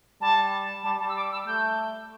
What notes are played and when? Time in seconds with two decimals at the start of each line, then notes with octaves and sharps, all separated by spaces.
0.21 G3 A5
0.84 G3 A5
1.00 G3 A5
1.09 E6
1.16 D6
1.32 E6
1.47 A3 G6